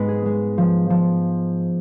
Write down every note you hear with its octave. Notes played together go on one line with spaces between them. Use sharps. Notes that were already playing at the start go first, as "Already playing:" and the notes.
Already playing: G#2 G#3 B3 B4
G#4
G#3
F3
F3